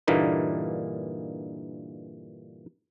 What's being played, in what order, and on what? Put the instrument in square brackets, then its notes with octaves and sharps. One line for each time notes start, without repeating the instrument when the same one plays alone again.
[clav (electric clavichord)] G2 A#2 D3 E3 A#3 D#4